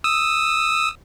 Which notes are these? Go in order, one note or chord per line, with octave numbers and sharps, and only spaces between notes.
D#6 E6